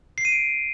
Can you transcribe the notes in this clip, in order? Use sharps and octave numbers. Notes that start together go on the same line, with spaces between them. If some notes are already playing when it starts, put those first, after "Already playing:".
C7
D#7
D7